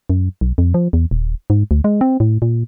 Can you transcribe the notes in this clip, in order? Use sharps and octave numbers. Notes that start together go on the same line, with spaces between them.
F#2
B1
F2
F3
E2
D#1
G#2
D2
G#3
C4
A2
A#2